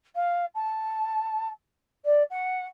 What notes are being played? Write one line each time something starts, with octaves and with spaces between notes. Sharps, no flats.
F5
A5
D5
F#5